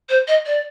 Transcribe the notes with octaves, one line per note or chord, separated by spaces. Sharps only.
C5
D#5
D5